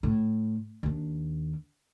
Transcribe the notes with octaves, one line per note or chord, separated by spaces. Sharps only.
A2
D#2 D4